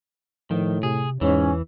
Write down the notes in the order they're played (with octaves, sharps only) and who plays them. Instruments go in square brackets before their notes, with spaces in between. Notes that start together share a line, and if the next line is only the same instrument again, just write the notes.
[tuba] A2 [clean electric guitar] D#3 [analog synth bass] F3
[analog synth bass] C3 [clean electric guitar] G#4
[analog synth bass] E2 [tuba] G#2 [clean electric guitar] E3 [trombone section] C#4